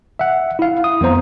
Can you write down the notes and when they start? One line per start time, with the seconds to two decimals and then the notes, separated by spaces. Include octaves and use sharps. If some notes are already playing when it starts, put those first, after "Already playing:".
0.19 E5 F#5
0.59 E4 F5
0.84 D#6
1.01 F2 B3 C5 A#5